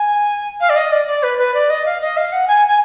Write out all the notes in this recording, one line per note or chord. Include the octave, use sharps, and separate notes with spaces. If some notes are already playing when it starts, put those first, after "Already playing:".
Already playing: G#5
F5
D5
D#5
D5
D5
B4
B4
D5
D#5
F5
D#5
F5
F#5
G#5
G#5